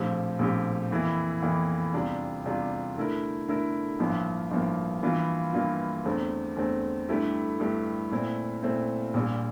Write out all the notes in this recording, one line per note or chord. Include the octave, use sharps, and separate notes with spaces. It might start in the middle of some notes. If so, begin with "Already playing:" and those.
Already playing: A#1 A2 F3 C4 G4
A#1 A2 F3 C4 G4
F2 E3 A#3 E4
F2 E3 A#3 E4
E2 C3 G3 D4 F4
E2 C3 G3 D4 F4
D3 A3 E4 A#4
D3 A3 E4 A#4
A1 G2 F3 A#3
A1 G2 F3 A#3
G2 E3 A#3 F4
G2 E3 A#3 F4
E2 D3 A3 C4
E2 D3 A3 C4
G2 D3 A3 E4 G4
G2 D3 A3 E4 G4
A#2 A3 C4 E4
A#2 A3 C4 E4
A#1 A#2 G3